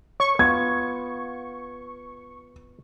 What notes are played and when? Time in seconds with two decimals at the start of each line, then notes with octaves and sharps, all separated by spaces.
0.20 C#5 C#6
0.39 B3 F4 G#6